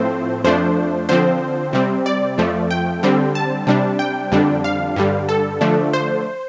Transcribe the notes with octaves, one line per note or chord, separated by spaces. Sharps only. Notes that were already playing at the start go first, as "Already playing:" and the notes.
Already playing: A2 F3 A3 C4 C5
F2 F3 A3 D4 C5
D3 F3 C4 C5
C3 G3 C4
D5
F2 F3 A3
G5
D3 G3 C4
A5
C3 G3 D4
G5
F2 D3 G3 D4
F5
G2 D3 G3
A4
D3 F3 A3 D4
C5